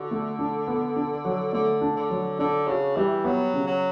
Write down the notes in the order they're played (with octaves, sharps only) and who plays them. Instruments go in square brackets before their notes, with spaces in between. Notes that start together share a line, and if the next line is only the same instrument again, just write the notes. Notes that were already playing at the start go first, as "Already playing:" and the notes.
Already playing: [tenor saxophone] D3 [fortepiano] F#4
[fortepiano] A3
D4
B3
D4
F#3
[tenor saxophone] D3 [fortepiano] A3
[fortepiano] D4
[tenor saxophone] D3
[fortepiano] F#3
[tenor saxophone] D3 [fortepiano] D4
[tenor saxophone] C#3 [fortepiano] F#4
[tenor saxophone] E3 [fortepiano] G3
[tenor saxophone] F#3 [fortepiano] B3
[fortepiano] C#3
[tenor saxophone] F#3